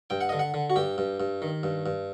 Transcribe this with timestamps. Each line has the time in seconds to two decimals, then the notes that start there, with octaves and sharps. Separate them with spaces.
0.10 G2 G5
0.21 F#5
0.29 D3 D#5
0.39 F#5
0.54 D3
0.70 F#4
0.76 G2 G4
0.98 G2
1.20 G2
1.42 D#3
1.63 G2
1.86 G2